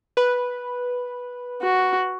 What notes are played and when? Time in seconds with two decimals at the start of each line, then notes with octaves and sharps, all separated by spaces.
0.17 B4 B5
1.62 F#4